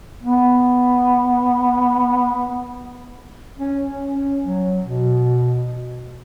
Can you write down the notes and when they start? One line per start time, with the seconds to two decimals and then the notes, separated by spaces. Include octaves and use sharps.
0.23 B3
3.58 C#4
3.86 C#4
4.14 C#4
4.42 F#3
4.83 B2